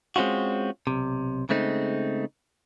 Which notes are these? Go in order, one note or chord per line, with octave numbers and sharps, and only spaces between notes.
G#3 C4 C#4 F4 F#4
B1 C3
C#3 G#3 A3 C4 D4 D#4